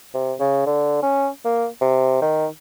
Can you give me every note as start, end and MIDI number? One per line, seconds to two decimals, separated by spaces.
0.14 0.33 48
0.40 0.65 49
0.66 0.99 50
1.02 1.28 61
1.45 1.67 58
1.81 2.21 48
2.22 2.46 51